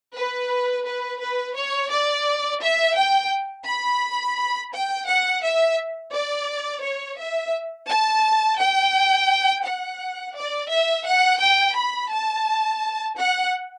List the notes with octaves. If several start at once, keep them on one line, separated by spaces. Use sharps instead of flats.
B4
B4
B4
C#5
D5
E5
G5
B5
G5
F#5
E5
D5
C#5
E5
A5
G5
F#5
D5
E5
F#5
G5
B5
A5
F#5